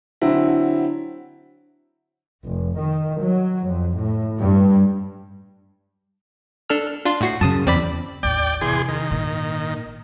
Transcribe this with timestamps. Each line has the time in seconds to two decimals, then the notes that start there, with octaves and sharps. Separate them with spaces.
0.21 D3 F#3 C4 E4
2.45 F1
2.79 D#3
3.21 F#3
3.67 F2
3.97 A2
4.40 G2
6.70 D4 A4 F6
7.05 D4 F4 C6
7.21 A2 F#4 C7
7.41 F#2 C#3 A5 D#6
7.67 E2 C4 D5 B5
8.23 A1 D#2 D5 G5
8.61 E2 C3 G#4 C6
8.88 D#3
9.10 G#1 A#2